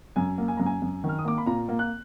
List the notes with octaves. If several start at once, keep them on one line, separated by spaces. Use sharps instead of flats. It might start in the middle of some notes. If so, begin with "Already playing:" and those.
F#2 G#5
A#3
G#5
F#2 A#5
G#5
F#2
D#3
F6
D#6
A#3 D6
B5
A#2 A#5
A#3
F#6